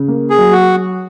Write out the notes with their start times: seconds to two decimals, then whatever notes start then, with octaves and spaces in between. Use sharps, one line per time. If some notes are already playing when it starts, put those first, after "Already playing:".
Already playing: C#3
0.08 A#3
0.30 G#4
0.38 F#3
0.52 F#4